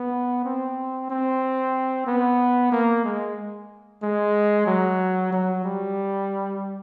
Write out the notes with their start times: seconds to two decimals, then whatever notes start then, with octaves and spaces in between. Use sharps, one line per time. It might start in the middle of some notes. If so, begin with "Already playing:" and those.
Already playing: B3
0.45 C4
1.10 C4
2.07 B3
2.72 A#3
3.04 G#3
4.02 G#3
4.66 F#3
5.32 F#3
5.64 G3